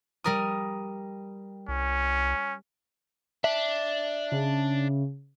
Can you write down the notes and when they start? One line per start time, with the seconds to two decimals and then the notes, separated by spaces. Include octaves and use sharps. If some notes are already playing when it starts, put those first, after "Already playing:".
0.24 G3 A#4 D#6
1.68 C2 C#4
3.44 D4 E5
4.32 C#3